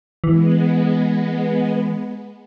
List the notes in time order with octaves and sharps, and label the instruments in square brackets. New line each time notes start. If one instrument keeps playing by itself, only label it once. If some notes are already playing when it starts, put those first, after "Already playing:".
[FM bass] E3 [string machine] G#3 B3